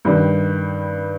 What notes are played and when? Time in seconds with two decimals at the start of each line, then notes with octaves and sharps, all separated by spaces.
0.05 G2 D#3 G3